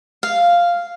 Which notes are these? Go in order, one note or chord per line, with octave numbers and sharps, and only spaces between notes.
F5